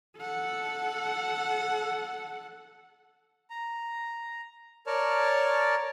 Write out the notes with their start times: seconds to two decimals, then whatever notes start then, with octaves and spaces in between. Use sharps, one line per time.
0.18 A4 F#5
3.50 A#5
4.87 A#4 C#5 D5 A5 F6